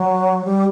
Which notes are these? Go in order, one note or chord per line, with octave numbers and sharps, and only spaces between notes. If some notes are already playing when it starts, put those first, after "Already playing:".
Already playing: F#3
G3